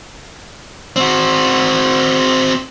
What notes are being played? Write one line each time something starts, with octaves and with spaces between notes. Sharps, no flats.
C4 F#4